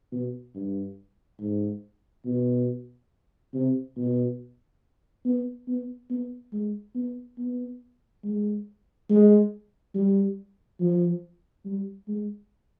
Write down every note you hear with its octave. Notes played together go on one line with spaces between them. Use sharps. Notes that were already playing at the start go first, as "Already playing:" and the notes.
B2
G2
G#2
B2
C3
B2
B3
B3
B3
G#3
B3
B3
G#3
G#3
G3
F3
G3
G#3